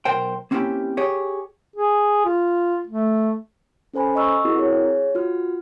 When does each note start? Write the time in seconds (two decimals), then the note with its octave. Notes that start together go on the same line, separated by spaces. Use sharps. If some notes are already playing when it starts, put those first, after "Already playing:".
0.05 B1 B2 A#4 C5 G5
0.51 A#3 C4 C#4 E4 G4
0.97 G4 G#4 C#5
1.76 G#4
2.25 F4
2.87 A3
3.94 C#4 A4 C5 G#5 B5
4.15 D#5 A#5 C#6 E6 F6
4.45 C4 E4 F#4 G#4 A#4 A#5
4.58 G#4 C#5
5.15 F4 F#4 F6